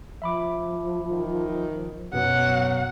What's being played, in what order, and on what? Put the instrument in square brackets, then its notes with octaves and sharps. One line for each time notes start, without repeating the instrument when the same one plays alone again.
[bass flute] F3 [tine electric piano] E5 B5 D6
[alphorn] D#3
[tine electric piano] F#2 B2 B3 [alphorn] F#3 [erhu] F#5